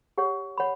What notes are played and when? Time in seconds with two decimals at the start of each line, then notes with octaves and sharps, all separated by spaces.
0.18 G4 C#5 F#5
0.58 C#5 F#5 B5